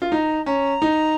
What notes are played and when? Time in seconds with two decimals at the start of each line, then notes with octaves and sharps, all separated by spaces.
0.02 F4
0.12 D#4 A#5
0.46 C#4 A#5
0.82 D#4